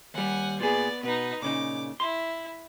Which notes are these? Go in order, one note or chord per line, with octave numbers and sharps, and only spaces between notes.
D#2 G3 F#5 G#5
A#2 B3 G#4 D5
B2 D#4 B4
A#2 C#3 D#4 D6
E4 C6